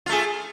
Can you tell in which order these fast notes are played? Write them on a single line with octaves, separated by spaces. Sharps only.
F4 A3 G#4